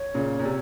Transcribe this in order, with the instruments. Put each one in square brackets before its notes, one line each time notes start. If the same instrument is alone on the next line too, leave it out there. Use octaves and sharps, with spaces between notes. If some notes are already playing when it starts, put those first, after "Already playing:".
Already playing: [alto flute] C#5
[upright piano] A#2 C#3
A#2
C3